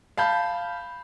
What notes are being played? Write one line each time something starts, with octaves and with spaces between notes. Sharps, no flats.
F5 A5 B5 G6